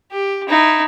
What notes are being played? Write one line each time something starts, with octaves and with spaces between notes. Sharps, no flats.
G4
D#4 E4